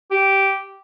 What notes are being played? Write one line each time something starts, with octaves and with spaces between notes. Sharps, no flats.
G4